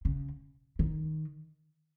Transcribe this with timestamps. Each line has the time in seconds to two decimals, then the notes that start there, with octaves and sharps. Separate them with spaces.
0.05 C#3
0.79 D#3